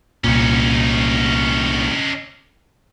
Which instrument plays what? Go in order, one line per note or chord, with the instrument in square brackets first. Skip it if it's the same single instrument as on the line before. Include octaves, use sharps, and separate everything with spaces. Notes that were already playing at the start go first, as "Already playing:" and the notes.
[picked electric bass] C2 A#2 [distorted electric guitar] C#4 D#4